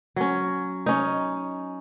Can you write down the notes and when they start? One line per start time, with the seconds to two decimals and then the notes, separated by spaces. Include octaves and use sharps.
0.16 F#3 C#4
0.86 C#4 D#4